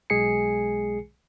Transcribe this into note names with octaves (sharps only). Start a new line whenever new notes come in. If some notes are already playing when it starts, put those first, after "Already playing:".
B1 G#3 G#4 G#5 C7 C#7